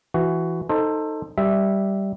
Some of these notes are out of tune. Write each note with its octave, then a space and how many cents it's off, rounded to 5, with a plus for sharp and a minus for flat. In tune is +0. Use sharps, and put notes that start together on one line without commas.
E3 +15 F#4 +15
D#4 +0 A4 +15 C5 +15
G3 -5 E5 +0